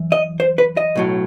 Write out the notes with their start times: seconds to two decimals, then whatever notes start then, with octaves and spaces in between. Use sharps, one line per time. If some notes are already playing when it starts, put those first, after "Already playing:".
Already playing: F#2 E3
0.12 D#5
0.40 C5
0.58 B4
0.77 D#5
0.95 B1 A2 F#3